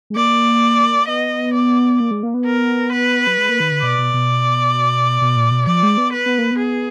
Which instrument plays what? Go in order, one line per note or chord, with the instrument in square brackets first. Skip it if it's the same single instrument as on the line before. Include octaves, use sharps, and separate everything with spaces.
[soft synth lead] G#3
[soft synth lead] A#3 [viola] D5
[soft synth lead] B3 [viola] D#5
[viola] D5
[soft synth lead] A#3
G#3
A#3
B3
[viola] A#4
B4
[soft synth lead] F#3
G#3
A#3
D#3
D3
[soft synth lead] B2 [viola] D5
[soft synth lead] B2
B2
B2
A#2
B2
[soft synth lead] F3 [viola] D5
[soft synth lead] G#3
B3
[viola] B4
[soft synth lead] B3
A#3
B3
[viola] G#4